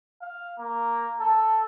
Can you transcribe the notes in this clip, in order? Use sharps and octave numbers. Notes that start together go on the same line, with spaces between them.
F5
A#3
A4